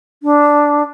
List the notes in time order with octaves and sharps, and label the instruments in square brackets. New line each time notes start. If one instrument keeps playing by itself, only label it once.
[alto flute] D4